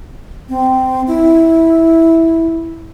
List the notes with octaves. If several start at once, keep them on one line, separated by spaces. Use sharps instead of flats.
C4
E4